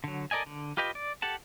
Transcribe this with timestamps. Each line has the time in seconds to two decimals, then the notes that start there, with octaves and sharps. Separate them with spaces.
0.04 D3 F#3
0.31 A4 A#4 D5 D#5 G#5
0.46 D3
0.77 F4 G4 B4 D#5 G5
0.95 D5
1.22 G4 A4 F#5 A5